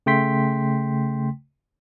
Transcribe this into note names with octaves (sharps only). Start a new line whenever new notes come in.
C#3 A3 G5 C6 B6